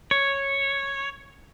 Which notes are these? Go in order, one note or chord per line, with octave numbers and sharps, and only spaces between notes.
C#5